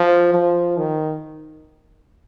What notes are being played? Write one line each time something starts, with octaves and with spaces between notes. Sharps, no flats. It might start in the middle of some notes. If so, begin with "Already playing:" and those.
Already playing: F3
F3
D#3